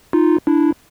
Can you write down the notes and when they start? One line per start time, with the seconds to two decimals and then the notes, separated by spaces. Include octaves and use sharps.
0.13 D#4 F4
0.47 D4 E4